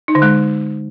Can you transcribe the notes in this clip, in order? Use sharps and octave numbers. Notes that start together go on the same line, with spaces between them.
D#4
D3
G#3